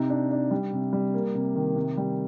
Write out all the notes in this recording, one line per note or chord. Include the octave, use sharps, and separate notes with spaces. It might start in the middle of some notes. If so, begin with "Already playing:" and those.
Already playing: C3 D#4
D4
D4
G3
C3
G3
A#3
C3
D#3
C3
G3